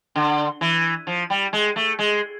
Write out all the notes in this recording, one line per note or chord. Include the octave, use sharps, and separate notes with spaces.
D3
E3
F3
G3
G#3
A3
G#3